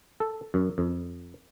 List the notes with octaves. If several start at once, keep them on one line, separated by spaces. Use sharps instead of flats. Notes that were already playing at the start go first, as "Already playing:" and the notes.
A4
F#2
F2